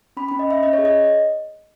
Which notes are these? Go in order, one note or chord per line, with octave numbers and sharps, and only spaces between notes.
C#4 B5
B5
C#4
D#5
C#4 E5
C#4 D#5
C#5
G#4
D#5